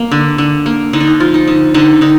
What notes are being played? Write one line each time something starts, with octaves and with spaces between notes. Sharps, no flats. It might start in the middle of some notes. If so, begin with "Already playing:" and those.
Already playing: A#3
D3
D3
A#3
D3 D#4
D4
D#4
F3 F4
D#4
D3 D#4
D3 D#4
D3 D#4